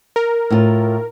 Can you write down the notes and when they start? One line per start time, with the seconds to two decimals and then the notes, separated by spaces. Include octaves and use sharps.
0.16 A#4
0.50 A2 F4